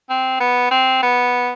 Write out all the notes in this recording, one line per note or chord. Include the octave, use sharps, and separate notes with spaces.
C4
B3
C4
B3